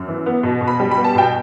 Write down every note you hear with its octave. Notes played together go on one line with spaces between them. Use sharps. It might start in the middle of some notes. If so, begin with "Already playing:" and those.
Already playing: F#2
E3
B3
B2
B2
B5
G3
B5
B3
A5
B2 G5